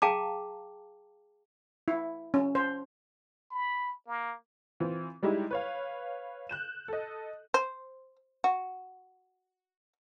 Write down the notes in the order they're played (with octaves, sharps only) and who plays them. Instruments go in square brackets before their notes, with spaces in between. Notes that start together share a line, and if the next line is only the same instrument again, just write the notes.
[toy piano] G#4 F5 G5 A5 A#5 D6
[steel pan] E4
C#4
C5
[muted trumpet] B5
A#3
[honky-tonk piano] E3 C4 F4
G3 G#3 D#4 E4 G4
B4 C#5 F5
F#6 G6 E7
A4 D#5
[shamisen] C5
F#4